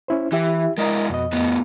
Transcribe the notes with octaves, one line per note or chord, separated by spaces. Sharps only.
C#4 E4 C5
E3 E4 G4 E5
G#3 E4 A#4 D5 D#5 A#5
F2 B2 D#5
A2 B3